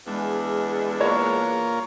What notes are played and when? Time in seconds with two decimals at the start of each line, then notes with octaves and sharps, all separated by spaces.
0.07 E2 G#3 D4
1.00 A#3 F4 A#4 C#5